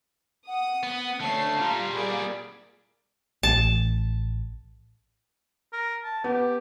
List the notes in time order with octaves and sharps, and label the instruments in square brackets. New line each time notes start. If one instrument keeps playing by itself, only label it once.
[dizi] F#5 [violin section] D#6
[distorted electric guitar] B3
[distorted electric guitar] D2 A3 [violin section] C#4 C7 [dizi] A5
[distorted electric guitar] A#2 G3 [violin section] F4 A#5 C6
[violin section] G#4 A#4 D5 [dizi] B5
[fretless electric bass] A1 [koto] A5
[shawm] A#4
A5
[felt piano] B3 [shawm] G4